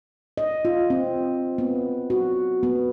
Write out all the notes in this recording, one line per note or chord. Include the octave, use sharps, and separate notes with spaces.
D#5
F4
C4
B3
F#4
B3